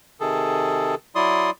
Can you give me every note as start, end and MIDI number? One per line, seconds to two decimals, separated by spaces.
0.20 0.95 48
0.20 0.95 51
0.20 0.95 68
0.20 0.95 69
1.15 1.50 54
1.15 1.50 64
1.15 1.50 74
1.15 1.50 84
1.15 1.50 87